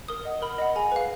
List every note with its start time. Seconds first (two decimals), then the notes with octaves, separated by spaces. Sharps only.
0.08 A#4 D#6
0.25 D#5 F#5
0.42 A#4 B5
0.58 D#5 F#5
0.76 G#4 G#5
0.92 B4 F5